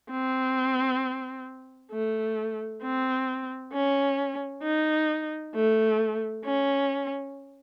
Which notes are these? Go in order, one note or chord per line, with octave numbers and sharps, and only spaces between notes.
C4
A3
C4
C#4
D#4
A3
C#4